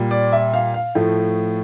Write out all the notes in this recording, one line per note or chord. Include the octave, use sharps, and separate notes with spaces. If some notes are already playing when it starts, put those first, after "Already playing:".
Already playing: A#2 G3
D5
E5
F5
F5
A2 F3 A3